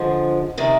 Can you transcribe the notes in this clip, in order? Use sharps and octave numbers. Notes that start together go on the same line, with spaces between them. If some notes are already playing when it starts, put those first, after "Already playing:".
Already playing: D3 F3 G#3
C3 D#3 G3